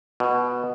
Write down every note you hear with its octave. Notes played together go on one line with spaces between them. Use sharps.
B2